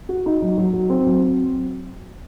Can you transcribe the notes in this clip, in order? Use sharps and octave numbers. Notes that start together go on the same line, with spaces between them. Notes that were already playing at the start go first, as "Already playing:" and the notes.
F#4
D#4
F#3
F#3
F#3
C4
F#3
C4